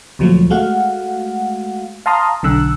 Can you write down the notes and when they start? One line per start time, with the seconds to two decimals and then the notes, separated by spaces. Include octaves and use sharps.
0.19 D2 A#2 F3 F#3 A3
0.50 G#3 A3 F#4 F5 F#5
2.06 F5 A5 A#5 C6 D#6 F6
2.43 B1 D3 E6 F#6